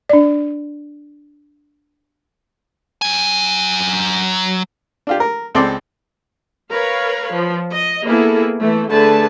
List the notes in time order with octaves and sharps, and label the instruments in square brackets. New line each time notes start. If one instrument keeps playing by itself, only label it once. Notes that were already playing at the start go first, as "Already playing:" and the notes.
[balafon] D4 D5
[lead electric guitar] F#3 G#5
[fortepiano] D4 F4 G4
A#4
C#2 C4 A4 D5 C6 D6
[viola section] A#4 B4 C#5 F5
F3
D#5
A#3 B3 E4 G#4 A4
E3 A3
D3 A3 G#4 A4 B4 A5